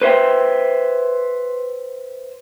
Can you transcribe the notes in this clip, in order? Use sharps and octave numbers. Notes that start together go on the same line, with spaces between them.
B4 C5 E5 G5